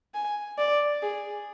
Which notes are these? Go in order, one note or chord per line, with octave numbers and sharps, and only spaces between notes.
G#5
D5
G#4